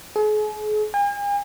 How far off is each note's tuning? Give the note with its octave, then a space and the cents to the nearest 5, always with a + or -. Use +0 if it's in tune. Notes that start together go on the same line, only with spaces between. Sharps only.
G#4 +40
G#5 -45